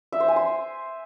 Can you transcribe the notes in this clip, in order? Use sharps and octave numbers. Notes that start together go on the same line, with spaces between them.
E5
C5
G#5
C6